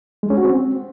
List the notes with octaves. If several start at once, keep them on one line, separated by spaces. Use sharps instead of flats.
G#3
C#4
F#4
C4